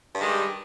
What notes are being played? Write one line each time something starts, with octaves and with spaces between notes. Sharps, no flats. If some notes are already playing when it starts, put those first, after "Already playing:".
G2 D#3 G3 G#3